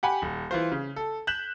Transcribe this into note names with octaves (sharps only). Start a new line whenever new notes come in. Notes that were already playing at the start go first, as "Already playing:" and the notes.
G4 F#5 G#5 B5
D#1
E3 F4 C5
C#3
A4
F#6 G6 B6 E7 F#7